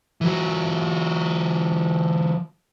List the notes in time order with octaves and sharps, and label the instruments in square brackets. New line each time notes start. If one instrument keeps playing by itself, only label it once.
[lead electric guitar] E3 F#3